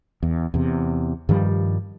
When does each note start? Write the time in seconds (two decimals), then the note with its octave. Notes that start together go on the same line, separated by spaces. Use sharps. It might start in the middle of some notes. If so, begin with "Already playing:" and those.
0.23 E2
0.54 E2 C3
1.29 G2 D#3 F3 G3